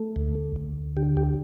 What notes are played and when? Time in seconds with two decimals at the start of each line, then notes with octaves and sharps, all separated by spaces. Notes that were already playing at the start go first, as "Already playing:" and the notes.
Already playing: A3
0.16 D2
0.56 D2
0.97 D3 G4
1.17 G4